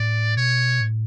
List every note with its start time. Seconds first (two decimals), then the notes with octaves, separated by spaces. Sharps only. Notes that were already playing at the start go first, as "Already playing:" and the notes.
Already playing: A2 D5
0.37 B2 C#5
0.81 A2